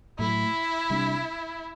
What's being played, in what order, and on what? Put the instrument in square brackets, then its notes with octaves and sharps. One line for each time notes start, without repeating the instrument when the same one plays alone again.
[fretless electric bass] A2 F#3 A3 [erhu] E4
[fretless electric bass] C3 G3 D4